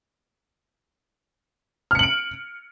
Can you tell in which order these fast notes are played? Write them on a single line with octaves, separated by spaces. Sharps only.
F6 C#7 F#7 D7